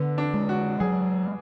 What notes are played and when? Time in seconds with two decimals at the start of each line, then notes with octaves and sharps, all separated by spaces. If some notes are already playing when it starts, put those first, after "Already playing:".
Already playing: D3 B3
0.18 D4
0.34 G#3
0.49 F#4
0.80 F#3 G#4